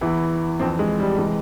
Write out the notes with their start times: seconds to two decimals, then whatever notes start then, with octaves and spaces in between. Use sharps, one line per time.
0.01 E2 E3 E4
0.59 F2 E3 C4
0.79 G#3
0.99 G3
1.18 C3 E3 G#3